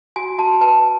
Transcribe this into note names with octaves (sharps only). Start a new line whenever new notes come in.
F#4 G#5
F#4 A5
B4 A5